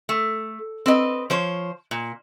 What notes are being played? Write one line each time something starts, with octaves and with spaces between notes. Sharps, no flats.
A3
C4 B4 D#5
F3 C5 C#5
A#2